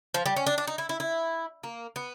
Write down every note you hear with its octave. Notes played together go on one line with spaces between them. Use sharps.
F3
G3
C#4
D4
D4
D#4
E4
E4
E4
A#3
B3